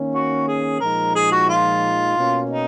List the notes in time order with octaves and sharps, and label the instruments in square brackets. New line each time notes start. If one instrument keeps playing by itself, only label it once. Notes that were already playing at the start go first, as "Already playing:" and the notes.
Already playing: [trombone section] D#3 A#3 C#4
[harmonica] F#4
G#4
[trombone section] A#2 F3 G#3 D#4 [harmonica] A#4
[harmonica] G#4
F#4
F4
[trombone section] B2 A#3 C#4
[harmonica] D#4